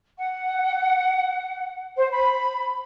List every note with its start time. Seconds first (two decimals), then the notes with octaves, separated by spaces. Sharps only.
0.18 F#5
1.97 C5
2.12 B5